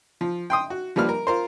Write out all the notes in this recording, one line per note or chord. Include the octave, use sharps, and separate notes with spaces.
F3
G5 C6 D#6
F#4
F3 G3 A#3 B4 F6
A#4
F4 A#4 C5